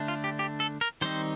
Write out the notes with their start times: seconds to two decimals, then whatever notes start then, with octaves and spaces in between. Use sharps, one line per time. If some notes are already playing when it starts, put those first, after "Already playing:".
Already playing: D3 A3 D4
0.08 F4
0.24 G4
0.39 G4
0.60 A4
0.81 A#4
1.01 D#3 G3 C4 D#4 C5